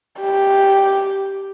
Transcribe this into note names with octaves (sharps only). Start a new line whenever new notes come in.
G4